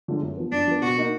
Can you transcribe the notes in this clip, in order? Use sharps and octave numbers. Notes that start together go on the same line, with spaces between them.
D3 F3 G#3
F#2
F3 B3
F#2 D4
F3 B3
B2 F#4
A#3 D#4